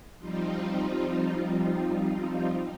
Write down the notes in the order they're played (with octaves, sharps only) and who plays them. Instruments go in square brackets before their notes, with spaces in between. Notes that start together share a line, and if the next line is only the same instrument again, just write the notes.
[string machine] F3 G3 C4 D#4 F4